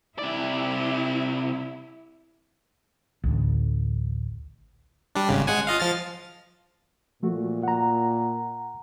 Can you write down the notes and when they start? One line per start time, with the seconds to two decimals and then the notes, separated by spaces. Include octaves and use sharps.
0.19 C3 E4 D5
3.24 A1 D2
5.15 G3 D4
5.29 G#1 C#3
5.47 G#3 F#5 G#5
5.67 F4 D#5 F5
5.80 F3 F6 A6
7.23 A#2 F3 A3 F#4
7.63 F#5 A#5